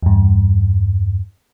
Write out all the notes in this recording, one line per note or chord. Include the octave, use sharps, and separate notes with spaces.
E2 G2